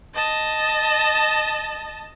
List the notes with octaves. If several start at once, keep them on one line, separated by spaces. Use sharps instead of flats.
D#5 A5